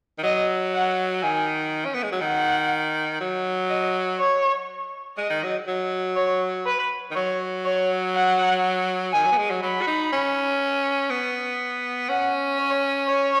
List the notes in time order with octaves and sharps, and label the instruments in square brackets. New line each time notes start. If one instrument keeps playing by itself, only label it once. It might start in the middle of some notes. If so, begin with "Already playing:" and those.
[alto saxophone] D#3
[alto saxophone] F#3 [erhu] D#5
[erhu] F#5
[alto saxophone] D#3 [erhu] G#5
[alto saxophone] C#4
B3
G#3
F#3
[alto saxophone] D#3 [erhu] F#5
[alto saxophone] F#3
[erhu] D#5
C#5
[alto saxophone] G#3 [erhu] D#5
[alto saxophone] D#3
F#3
F#3
[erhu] C#5
B4
[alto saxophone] D#3
[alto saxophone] F#3 [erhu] C#5
[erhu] C#5
F#5
[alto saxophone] D#3 [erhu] G#5
[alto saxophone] F#3
B3
G#3
F#3
[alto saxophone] F#3 [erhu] B5
[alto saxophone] F#4
D#4
C#4
B3
[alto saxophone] C#4 [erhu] F#5
[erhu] C#5
C#5